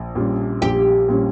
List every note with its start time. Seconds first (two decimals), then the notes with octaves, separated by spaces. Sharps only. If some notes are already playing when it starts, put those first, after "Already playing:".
Already playing: A#1
0.15 A#2 G3 C#4
0.62 A#1 G4
1.09 A#2 G3 C#4